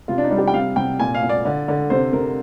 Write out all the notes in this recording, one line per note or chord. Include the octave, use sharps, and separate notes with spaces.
C3 F4
D4
D#4
G3
G4
G5
C3 F5
C3 G5
A#2 G#5
F5
A#2
D5
D3
D3
C3 C5
C3 A#4